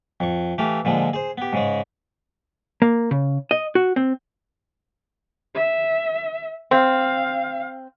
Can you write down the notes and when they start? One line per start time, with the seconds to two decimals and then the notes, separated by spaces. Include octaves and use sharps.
0.20 F2 C#6
0.58 E3 A3 G4 F5
0.85 A#2 D3 F3 G#3
1.13 G#4 C5
1.38 B3 G4
1.53 G#2 C#3 G#3
2.82 A#3
3.11 C#3
3.51 D#5
3.75 F#4
3.96 C4
5.54 E5
6.71 C4 F5